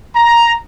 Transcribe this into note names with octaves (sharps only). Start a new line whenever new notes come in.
A#5